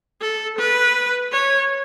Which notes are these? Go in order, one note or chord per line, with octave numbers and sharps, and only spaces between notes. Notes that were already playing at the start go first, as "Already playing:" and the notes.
A4
B4
C#5